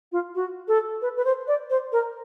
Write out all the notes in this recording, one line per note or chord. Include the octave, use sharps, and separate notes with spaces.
F4
F#4
A4
B4
B4
C5
D5
C5
A#4